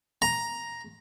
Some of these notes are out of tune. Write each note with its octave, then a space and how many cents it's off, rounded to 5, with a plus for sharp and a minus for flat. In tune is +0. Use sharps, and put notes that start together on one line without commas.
A#5 +5